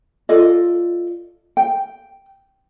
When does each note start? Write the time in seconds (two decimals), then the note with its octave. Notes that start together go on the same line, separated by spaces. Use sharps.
0.29 F4 A4 D5 D#5
1.57 G5